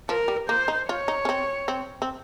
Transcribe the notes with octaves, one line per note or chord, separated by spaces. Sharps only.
F3 A#4
G3
A#3 C5
D#4
F4 C#5
D#4
C#4
C4
C4
C4